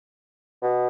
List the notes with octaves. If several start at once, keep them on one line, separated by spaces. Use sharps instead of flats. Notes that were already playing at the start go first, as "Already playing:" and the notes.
B2